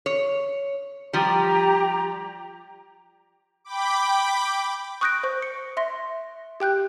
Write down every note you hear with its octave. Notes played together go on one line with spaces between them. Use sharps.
C#5
F3 G3 G4 A#5
G5 B5 D6
C#6 D#6 F#6 G6 A#6 D7
C5 C#6
C#7
E5 C6 A#6
G4 G5 F#6 G6